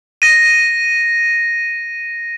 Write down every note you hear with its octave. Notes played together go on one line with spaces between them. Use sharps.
A#6 D#7